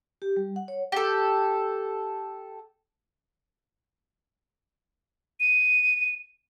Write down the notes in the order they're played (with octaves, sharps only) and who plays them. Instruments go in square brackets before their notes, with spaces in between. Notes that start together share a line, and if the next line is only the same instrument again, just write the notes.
[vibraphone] G4
G3
F#5
C#5
[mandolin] G4 A4
[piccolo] D#7